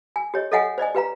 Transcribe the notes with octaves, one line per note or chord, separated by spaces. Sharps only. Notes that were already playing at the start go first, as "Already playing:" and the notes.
G#5
G4 C#5 D#5
A4 C#5 D#5 F5 F#5 G#5
C5 D5 D#5 G#5
G4 B4 F5 A#5